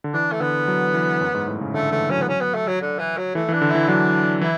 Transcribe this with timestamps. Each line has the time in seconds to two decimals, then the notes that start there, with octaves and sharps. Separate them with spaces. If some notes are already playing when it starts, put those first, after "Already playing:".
0.04 D3
0.13 E3 D4
0.32 A3
0.40 D3 B3
0.68 F#3
0.94 E3
1.21 F#2
1.34 G#2
1.47 A2
1.61 C#3
1.74 D3 A3
1.92 E3 A3
2.10 F#3 C#4
2.22 B3
2.28 C#4
2.41 B3
2.55 A3
2.68 F#3
2.82 D3
2.99 E3
3.17 F#3
3.35 E3 A3
3.49 E3
3.53 D4
3.62 D3
3.71 E3 E4
3.88 F#3 D4
4.41 E3 E4